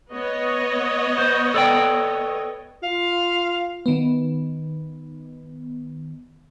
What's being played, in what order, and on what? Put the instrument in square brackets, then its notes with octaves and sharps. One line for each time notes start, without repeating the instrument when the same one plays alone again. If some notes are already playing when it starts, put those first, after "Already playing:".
[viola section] B3 C#5 D#5
[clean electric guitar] C5
A4 D5 G5
[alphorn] F4 [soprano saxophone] F5
[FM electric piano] D#3 B3